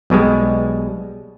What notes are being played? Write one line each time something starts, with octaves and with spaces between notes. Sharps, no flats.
B1 B2 G3 G#3